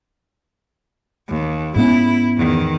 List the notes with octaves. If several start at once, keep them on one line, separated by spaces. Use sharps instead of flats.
D#2
G#2 B3 C#4 E4
E2 D#3